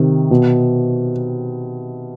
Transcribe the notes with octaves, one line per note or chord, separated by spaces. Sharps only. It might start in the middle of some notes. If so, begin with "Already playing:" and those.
Already playing: C3 D#3
B2